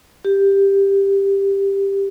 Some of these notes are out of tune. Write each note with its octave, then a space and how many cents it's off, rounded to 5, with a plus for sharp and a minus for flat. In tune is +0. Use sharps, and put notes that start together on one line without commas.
G4 +10